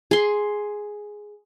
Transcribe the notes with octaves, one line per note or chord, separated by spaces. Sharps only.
G#4 C6